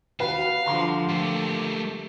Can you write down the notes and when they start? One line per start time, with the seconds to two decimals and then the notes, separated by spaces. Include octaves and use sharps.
0.20 D#2 F#4 B4 F5
0.66 D3 F3 G3 A#5 C6
1.09 A3 A#3 G4